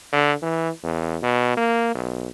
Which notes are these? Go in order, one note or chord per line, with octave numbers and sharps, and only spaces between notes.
D3
E3
E2
B2
A#3
B1